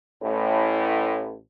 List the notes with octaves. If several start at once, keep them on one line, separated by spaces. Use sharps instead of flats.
A1 A2